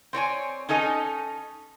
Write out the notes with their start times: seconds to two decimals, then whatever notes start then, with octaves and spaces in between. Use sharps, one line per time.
0.13 C4 C#5 D5 G#5
0.69 C#4 D#4 A4 D#5 G#5